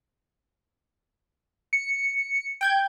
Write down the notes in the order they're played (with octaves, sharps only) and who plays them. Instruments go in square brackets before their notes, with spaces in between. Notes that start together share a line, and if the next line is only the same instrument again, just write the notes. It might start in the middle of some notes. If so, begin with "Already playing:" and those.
[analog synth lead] C#7
[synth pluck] G5 G6 G#6